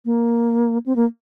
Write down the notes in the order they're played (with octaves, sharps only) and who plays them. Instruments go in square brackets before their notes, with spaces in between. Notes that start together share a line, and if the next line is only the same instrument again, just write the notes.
[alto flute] A#3
C4
A#3